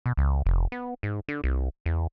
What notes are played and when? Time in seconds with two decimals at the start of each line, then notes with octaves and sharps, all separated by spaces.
0.06 B2
0.17 C#2
0.46 F1
0.72 B3
1.03 G#2
1.28 D3
1.44 C2
1.86 E2